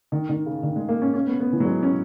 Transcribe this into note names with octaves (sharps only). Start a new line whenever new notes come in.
D#3
D#3
C#3
D#3
G#3
A#3
C#4
C#4
B3
B3
E3
F#3
G#3
C#4